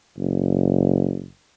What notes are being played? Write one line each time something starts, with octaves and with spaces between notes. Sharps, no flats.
F#1